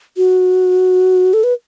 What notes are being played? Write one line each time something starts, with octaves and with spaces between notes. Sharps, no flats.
F#4
A4
B4